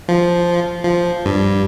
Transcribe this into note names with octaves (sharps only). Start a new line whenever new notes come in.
F3
F3
G2